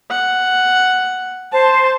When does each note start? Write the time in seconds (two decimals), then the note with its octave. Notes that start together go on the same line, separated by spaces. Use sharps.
0.11 F#5
1.52 C5 A5